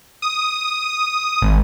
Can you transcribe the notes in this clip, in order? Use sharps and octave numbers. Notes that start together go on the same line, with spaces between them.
D#6
G#1